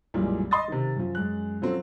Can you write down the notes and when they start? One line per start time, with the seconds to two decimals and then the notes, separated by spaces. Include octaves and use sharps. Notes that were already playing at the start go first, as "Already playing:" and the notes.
0.14 B1 F#2 A#2 E3 G3 G#3
0.51 D#5 C6 D#6 A6
0.68 C3 D#3
0.96 F#2 F3
1.15 F#2 G#3 F#6
1.62 F3 F#3 C4 A4